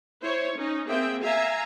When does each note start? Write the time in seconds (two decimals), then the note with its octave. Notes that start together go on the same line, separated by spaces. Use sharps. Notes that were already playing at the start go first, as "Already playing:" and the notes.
0.22 E4 C5 C#5
0.56 C#4 D#4
0.88 A#3 C4 G#4 E5 G5
1.22 E5 F5 G#5 A#5